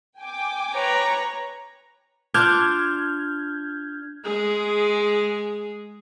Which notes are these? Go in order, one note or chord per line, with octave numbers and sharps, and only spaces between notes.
G5 G#5 D6
B4 C#5 A#5
D4 F4 F6 G6 G#6
G#3 G#4